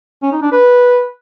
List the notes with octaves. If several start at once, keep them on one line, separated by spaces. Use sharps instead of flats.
C#4
D#4
D4
B4